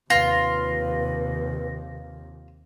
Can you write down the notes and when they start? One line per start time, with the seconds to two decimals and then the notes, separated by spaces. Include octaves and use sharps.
0.10 D#2 C3 F4 B4 A#6